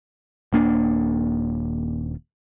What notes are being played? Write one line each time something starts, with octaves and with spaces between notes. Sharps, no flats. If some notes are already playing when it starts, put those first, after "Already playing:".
D#1 A#3 D4